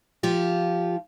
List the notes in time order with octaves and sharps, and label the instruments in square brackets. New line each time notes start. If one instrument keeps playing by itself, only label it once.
[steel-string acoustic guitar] F3 F4 G4